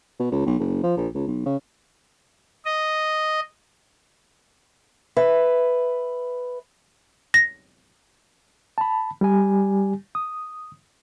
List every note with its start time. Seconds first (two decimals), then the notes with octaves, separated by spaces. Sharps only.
0.19 B2
0.32 C#2
0.46 B1
0.59 F#1
0.83 F3
0.97 A#1
1.14 C#2
1.27 B1
1.45 C#3
2.65 D#5
5.17 B4 E5
7.34 A#6
8.78 A5 B5
9.21 G3 G4 G#5
10.15 D#6